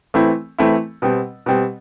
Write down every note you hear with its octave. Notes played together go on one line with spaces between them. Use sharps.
E3 A3 C4 E4
E3 A3 C4 E4
B2 G3 C4
B2 G3 C4